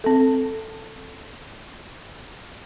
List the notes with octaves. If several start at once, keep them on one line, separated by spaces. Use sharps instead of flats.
C4 A4